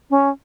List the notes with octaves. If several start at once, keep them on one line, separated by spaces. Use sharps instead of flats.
C#4